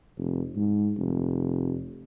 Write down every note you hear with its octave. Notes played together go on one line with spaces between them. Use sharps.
F1
G#2
F1